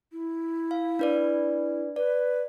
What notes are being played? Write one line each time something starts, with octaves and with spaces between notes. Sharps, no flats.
E4
F5
D4 B4 D5
B4 D5